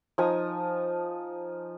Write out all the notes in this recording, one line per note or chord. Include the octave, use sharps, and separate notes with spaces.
F3 D#4 G#5 A#5